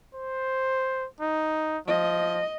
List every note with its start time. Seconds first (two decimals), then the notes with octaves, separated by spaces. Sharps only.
0.14 C5
1.21 D#4
1.88 F3 D#5